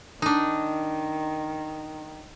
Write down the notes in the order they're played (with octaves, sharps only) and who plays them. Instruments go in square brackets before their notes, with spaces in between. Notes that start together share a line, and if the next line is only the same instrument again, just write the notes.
[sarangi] D#3 [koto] D4 D#4